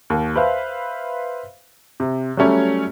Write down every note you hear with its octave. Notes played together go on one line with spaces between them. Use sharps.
D#2
B4 C5 E5 F5
C3
F#3 G3 A3 C#4 C#5